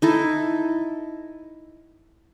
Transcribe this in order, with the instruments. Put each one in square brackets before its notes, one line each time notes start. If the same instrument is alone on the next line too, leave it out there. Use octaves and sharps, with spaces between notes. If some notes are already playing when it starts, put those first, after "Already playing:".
[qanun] D#4 E4 A4